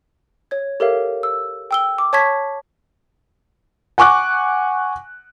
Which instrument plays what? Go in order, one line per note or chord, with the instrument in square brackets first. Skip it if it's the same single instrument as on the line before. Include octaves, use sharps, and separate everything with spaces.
[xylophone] C#5 G#6
G4 A4 A#4 C#5 E5 F5
E6
G5 E6 G7
D6
C#5 A5 C#6 G#6 B6
[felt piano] F#5 G#5 C#6 D6 F#6